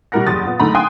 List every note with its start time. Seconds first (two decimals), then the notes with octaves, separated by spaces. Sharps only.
0.12 B2 G3 E4 A#4 F#5 A#6
0.27 F#1 E2 G4 D#6 A6
0.46 A#2 B3
0.59 F#1 D3 A3 D#4 A#5 B5
0.75 F5 G5 G#5 C6 D#6 F#6